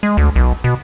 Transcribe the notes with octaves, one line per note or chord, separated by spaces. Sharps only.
G#3
D2
B1
B2